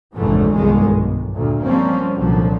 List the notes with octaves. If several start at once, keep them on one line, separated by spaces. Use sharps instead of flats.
F1 A#1 G#2 D3 E3 A3
G1 C2 F#2 D#3 G#3
B1
D2 A#2
F3 G3 A#3 C4 C#4
C2 A#2 D3 F3 F#3